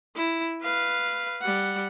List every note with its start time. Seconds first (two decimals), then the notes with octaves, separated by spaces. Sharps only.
0.16 E4
0.62 B4 F5
1.42 G3 F#5